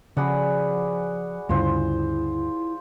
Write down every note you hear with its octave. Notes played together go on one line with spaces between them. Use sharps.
C#3 F3 F#4 G#4 D5 F#5 B5
D2 G2 C#3 E4 F4 C5